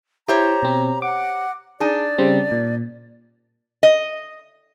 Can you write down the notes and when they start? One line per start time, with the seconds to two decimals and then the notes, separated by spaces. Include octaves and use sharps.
0.28 E4 G4 C5 C#5 A#5
0.63 B2 C4
1.02 F#5 D6
1.80 D4 D#4 G#4 D5
2.18 C#3 G3 C4
2.51 A#2
3.83 D#5